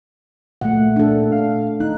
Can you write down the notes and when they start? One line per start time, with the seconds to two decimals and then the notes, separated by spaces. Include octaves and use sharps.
0.61 A#2 A3 F#5
0.96 D4 A4
1.32 F5
1.80 D#4 F#6